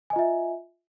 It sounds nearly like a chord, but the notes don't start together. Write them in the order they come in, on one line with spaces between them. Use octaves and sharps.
G#5 D#5 F4 E5